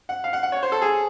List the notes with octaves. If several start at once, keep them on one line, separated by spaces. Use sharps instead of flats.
F#5
F5
F#5
F#5
C#5
C5
A4
G#4